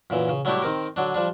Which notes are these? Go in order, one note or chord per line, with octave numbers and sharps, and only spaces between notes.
F#2 A#2 E3
C#3
F#3 G3 A3 D4 E4 G4
D#3 C4 A#4
D3 F#3 D4
F3 G3 D4